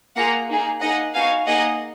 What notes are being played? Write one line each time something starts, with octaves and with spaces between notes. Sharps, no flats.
A#3 F4 G#4 F#5 A#5
A#3 D#4 G#4
A#3 D#4 G#4 D#5 F#5
B3 D#4 F#4 F5 G#5
A#3 D#4 G#4 D#5 F#5